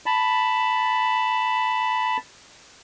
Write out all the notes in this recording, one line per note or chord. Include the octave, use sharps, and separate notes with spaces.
A5 B5